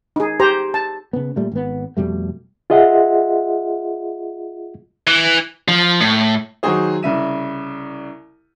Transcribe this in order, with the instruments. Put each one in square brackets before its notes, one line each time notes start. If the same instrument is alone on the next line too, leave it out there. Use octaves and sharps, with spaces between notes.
[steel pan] D#4 G#4
G4 C5 A#5
A5
[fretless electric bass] C#3 B3
A#2 G3 A3
G#1 B3
F2 B2 G3 A3
[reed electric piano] F4 G#4 D#5 E5 F#5
[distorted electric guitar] E3
[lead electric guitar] F3
A2
[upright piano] D#3 F#3 D#4 F#4 G#4 C5
C2 C#3 E5 D#7